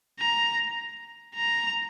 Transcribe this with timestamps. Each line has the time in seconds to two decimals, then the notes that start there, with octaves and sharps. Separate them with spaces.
0.20 A#5
1.35 A#5